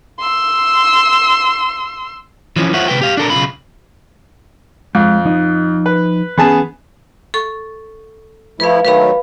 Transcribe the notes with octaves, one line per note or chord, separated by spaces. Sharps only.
C6 E6
E3 F3 C#4
F4 C5 C#5 E5 F#5
C3 E3 B4 G5
G4 F5
D4 A4 A#4
B1 C#3 F4 B5
F2 G#3
F3 D#4 D#5
B4
E3 B3 C#4 G#4 A5
A4 C#6
F3 A3 E4 B4 F5
D#3 F#3 A3 B4 F5 B5